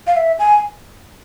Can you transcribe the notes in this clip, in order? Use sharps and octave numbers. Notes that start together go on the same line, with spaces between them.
F5
E5
G#5